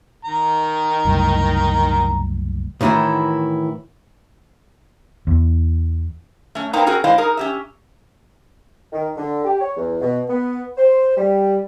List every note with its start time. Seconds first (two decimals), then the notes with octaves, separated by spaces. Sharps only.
0.25 D#3 A#5
1.05 F#1 C2 A2
2.81 A2 D#3 E3 E4 F#4
5.27 E2
6.55 A3 C#4
6.73 A#3 C4 D4 D#4 B4 A#5
6.86 C4 C#4 F#4 G#4 A#4
7.04 G#3 D4 E4 C5 D#5 F5
7.18 D#4 G#4 A#4
7.37 C#4 G4 E5
8.92 D#3
9.17 D3
9.44 G4
9.60 C#5
9.76 E2
10.01 B2
10.28 B3
10.77 C5
11.17 G3